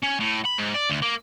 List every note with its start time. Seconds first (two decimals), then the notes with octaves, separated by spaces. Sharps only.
0.03 C#4
0.20 A2
0.45 B5
0.59 G#2
0.74 D5
0.90 D2
1.02 A#3